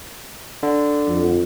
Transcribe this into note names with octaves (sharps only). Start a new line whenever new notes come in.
D3
F2